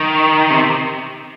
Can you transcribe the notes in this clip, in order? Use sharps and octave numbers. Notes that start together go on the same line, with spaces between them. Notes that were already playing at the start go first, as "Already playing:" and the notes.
Already playing: D#3
C3